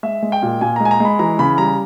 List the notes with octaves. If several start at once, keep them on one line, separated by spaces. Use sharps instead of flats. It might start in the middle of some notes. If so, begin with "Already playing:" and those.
G#3 E5
G#3
G5
A#2
A#2 G#5
G#3 A#5
G#5
A#5
G#3 B5
E3 A#5
C#3 B5
G3 A#5